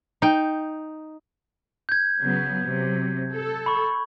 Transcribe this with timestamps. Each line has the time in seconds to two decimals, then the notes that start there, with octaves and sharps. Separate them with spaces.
0.22 D#4 G5
1.89 G6 G#6
2.22 C#3 F#3 B3
2.65 C3 F#3
3.34 A4
3.66 B5 C#6